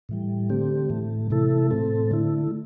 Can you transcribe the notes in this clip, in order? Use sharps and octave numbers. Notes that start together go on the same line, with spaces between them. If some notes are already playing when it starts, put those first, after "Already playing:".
A2 E3 G3
D3 A3 C4 G4
A2 E3 A3
C3 E3 A3 E4 A4
A2 A3 C4 A4
D3 A3 E4